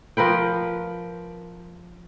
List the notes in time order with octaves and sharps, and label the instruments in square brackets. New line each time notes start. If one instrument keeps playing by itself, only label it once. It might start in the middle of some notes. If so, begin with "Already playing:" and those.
[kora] F3 A#4 B4 G5